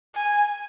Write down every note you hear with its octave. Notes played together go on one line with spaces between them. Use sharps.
G#5